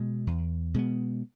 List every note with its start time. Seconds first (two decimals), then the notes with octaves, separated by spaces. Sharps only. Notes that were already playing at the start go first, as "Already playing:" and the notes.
Already playing: B2 G#3 B3
0.27 E2
0.74 B2 G#3 B3